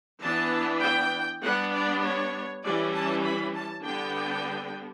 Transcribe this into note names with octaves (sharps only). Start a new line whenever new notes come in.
E3 B3 D4 A5
G5
G3 B3 D4 F#5
D5
C#5
E3 G3 C#4 D5
A5
B5
A5
D3 G3 B3 D4 G5